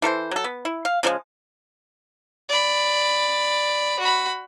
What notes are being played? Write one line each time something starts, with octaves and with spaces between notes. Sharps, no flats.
E3 A4 A#4 C5
F#3 A4
B3
E4
F5
C#3 F3 G3 G#3
D5 B5
F#4 B5